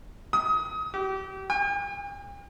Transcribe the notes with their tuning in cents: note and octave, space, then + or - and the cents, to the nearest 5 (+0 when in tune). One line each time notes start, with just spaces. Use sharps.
D#6 +25
G4 -30
G5 +45